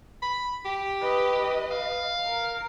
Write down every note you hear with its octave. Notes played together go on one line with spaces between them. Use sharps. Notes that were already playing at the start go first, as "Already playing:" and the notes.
B5
G4
B4 D#5
F5
A#4